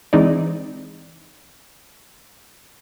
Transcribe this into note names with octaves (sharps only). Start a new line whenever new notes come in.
E3 G#3 C4 D#4 G#4 D5